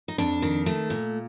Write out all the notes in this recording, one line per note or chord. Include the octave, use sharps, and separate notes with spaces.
D#4
F2 D4
D#3
A3
A#2